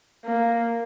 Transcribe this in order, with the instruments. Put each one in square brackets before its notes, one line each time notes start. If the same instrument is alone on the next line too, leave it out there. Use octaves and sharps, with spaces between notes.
[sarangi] A#3